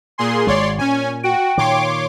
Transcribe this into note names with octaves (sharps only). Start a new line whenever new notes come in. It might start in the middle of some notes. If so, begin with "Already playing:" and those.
A#2 G#4 C6
G#1 G#3 C#5 D5 C6
A#2 C#4 G#5
F#4 G5
A#2 D#3 C#5 C6 D6